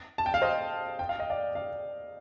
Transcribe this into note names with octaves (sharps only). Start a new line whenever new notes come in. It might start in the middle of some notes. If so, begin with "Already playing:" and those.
A5
G5
F5
C5 D#5
G5
F5
D#5
D5 F5
D5 F5